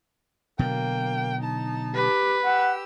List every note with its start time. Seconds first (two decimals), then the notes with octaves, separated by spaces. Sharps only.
0.59 B2 D3 F#3 A#3 G5
1.41 D#4 A5
1.95 G4 B4
2.45 G4 F#5 E6